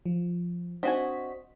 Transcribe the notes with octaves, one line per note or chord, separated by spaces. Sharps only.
F3
C4 D4 F#4 D#5 G#5 B6